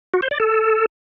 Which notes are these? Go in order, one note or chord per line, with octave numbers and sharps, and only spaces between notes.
F#4
C5
D5
A4